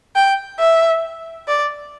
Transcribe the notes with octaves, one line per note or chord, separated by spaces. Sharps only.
G5
E5
D5